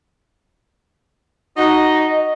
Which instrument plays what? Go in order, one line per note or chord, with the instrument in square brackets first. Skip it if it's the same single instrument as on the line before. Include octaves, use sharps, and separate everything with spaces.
[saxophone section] D#4 F#4 [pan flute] D#5